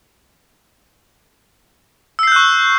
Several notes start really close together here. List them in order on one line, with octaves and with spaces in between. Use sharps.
E6 C7 G6 F#6 C#6